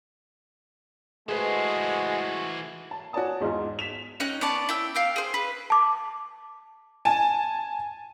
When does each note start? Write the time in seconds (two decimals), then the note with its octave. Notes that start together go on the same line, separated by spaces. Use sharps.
1.28 E3 G#3 A3 F#4 G#4 B4 C5 D#5
2.91 A5
3.13 F#4 C#5 D5 G#5 A5 D#6
3.40 E2 G#2 D#4 F4
3.79 B6 E7 F7
4.20 C#4 D#4 G5 F#6
4.41 B3 C#5 D5 A5
4.69 E4 G5 E6
4.95 F5 G5 E6
5.16 G#4 C5
5.34 B4
5.70 A5 D6
7.05 G#5 A5